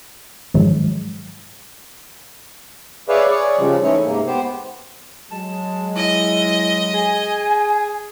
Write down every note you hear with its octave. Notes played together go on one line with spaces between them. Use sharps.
G#2 D#3 F3 F#3 G#3
G#4 B4 C#5 D5 E5 F5
G#4 C#5 D5
C#3 F3 G3 G#3
E3 A3 C#4 D#4 E4 C#5
G#2 C3 A#3
B3 G4 C5
F#3 G#3 A5
E4 D#5
G#4 G#5